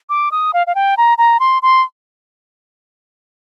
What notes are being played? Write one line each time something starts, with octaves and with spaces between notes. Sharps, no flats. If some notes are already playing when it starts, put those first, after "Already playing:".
D6
D#6
F5
F5
G5
A#5
A#5
C6
C6